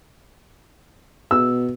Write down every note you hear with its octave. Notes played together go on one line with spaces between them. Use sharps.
B2 E6